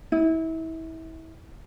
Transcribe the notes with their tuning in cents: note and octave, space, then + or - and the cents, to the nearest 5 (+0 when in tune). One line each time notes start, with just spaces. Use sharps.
E4 -30